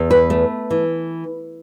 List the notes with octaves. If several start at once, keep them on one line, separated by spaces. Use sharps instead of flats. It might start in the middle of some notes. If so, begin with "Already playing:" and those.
Already playing: E2
B4
A3
E3